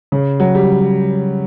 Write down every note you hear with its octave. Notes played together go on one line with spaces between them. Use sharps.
C#3
F#3
G3